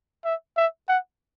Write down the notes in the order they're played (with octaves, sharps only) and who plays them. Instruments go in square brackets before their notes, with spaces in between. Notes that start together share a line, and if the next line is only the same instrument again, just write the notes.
[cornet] E5
E5
F#5